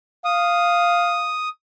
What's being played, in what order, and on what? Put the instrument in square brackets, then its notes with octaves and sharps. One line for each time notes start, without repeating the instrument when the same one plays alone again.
[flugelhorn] F5 [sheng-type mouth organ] D#6